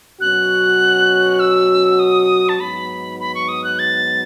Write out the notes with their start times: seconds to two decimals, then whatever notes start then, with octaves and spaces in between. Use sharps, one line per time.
0.20 B2 F#3 C#4 F#4 F#6
1.40 E6
1.99 D#6
2.49 A5
2.59 G#2 F#3 B3 D#4 B5
3.20 B5
3.35 C#6
3.48 D#6
3.64 F#6
3.79 A6